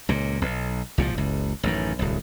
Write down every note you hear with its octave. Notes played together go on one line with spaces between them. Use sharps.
C#2 A#2
B1
C2 A#2 E3 F3
F#1 C#2
A1 F#2 D#3
D1 C2